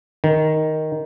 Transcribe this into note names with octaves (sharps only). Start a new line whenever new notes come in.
D#3